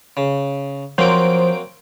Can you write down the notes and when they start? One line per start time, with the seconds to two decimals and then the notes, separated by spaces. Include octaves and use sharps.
0.17 C#3
0.98 F3 F#3 A#3 C4 C5 D7